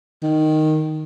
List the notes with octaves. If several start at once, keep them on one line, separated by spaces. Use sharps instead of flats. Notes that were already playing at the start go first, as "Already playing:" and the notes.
D#3